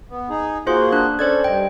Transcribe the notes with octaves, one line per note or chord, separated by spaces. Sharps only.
B3
D#4 G#4
A#3 F4 F#4 G#4 C5 C6
D4 F#6
C#4 A4 C5 D5 G#6
G2 D#5 G5